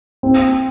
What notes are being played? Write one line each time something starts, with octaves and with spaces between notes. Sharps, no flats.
C4